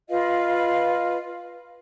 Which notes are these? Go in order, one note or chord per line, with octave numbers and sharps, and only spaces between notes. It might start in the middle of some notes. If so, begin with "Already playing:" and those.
F4 B4 D#5 F5